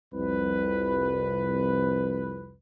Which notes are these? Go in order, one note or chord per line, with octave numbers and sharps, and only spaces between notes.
C2 F2 B4